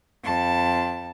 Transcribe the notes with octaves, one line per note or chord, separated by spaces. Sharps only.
F2 A5